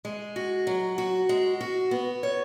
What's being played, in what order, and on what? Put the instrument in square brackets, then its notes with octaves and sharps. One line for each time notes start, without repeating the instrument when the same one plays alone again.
[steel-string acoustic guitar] G#3
F#4
F#3
F#4
G#3
F#4
B3
C#5